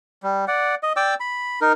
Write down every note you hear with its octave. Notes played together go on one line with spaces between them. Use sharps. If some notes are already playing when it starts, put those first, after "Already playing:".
G3
D5 F#5
D#5
D5 G5 D6 E6
B5
D#4 A#4